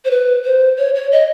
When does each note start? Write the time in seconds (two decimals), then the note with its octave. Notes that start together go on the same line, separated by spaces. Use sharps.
0.05 C5
0.11 B4
0.44 C5
0.78 C#5
0.95 C#5
1.12 D#5